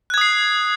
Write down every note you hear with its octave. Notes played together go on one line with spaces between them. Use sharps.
D#6 F#6 G#6 C7